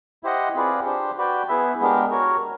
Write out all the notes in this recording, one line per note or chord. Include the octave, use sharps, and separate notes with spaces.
E4 G4 C5 D#5 F#5
C4 F4 G#4 B4 D5
D4 G4 C5
F#4 B4 D5 G5
B3 E4 G#4 B4 E5
G#3 B3 D4 G4 A#4
F#4 A#4 C#5